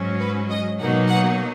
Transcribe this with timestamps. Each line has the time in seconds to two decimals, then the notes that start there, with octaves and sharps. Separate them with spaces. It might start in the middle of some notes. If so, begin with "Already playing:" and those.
Already playing: G#2 F#3 C#4
0.20 B4
0.50 D#5
0.80 B2 F#3 A#3 D#4 F#5
1.09 F#5